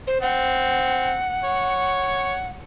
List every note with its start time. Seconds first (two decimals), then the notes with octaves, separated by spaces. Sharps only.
0.07 C5
0.22 C4 F#5
1.44 C#5